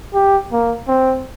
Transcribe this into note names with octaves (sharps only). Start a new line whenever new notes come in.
G4
A#3
C4